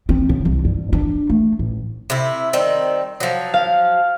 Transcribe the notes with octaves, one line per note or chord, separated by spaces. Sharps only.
C4
C#3
C2
G2
D4
A3
A1
C3 E4
D#3 G3 C4
F3 F#3
F5